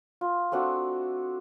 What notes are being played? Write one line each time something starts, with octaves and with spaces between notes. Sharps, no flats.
F4
A3 C4 D4 F#4